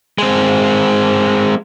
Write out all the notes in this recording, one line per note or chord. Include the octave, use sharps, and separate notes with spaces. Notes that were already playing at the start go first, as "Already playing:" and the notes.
G#3 C4